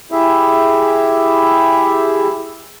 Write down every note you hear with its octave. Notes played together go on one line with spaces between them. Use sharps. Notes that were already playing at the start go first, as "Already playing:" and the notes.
E4 G4 G#4 E5